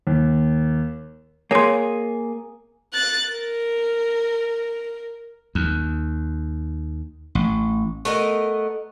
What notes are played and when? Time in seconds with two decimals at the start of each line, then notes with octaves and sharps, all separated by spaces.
0.07 D#2
1.51 A#3 G#4 C#5 C6
2.93 F#6 A6
3.29 A#4
5.55 D#2
7.35 A1
8.05 A3 B3 A#4 D#5